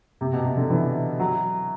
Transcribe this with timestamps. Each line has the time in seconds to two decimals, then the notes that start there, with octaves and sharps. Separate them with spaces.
0.21 C3
0.33 B2
0.45 C3
0.57 D3
0.70 E3
1.19 F#3